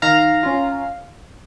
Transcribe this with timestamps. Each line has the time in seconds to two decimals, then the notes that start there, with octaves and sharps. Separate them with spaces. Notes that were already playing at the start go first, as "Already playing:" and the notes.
0.02 D#3 F5 A#5
0.43 C#4 F4